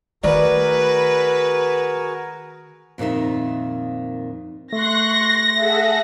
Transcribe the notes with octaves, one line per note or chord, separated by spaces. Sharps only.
D#3 A3 F#4 G#4 A#4 B4 D5
F2 A#2 D#3 D#4 E5
A3 C6 C#6 F#6 A#6
G#4 A4 E5 F#5